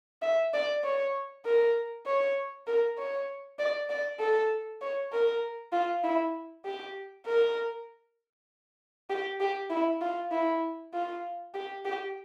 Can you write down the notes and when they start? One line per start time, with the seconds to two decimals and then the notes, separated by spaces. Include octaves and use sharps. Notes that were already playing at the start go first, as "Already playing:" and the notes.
0.22 E5
0.54 D5
0.84 C#5
1.45 A#4
2.07 C#5
2.67 A#4
2.98 C#5
3.59 D5
3.90 D5
4.20 A4
4.82 C#5
5.13 A#4
5.73 F4
6.04 E4
6.64 G4
7.27 A#4
9.10 G4
9.40 G4
9.70 E4
10.01 F4
10.31 E4
10.94 F4
11.54 G4
11.85 G4